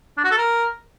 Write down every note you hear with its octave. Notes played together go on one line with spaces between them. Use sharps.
D4
F#4
A4
A#4